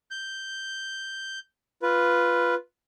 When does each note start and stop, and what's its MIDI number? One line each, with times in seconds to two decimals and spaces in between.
0.11 1.39 91
1.82 2.55 65
1.82 2.55 71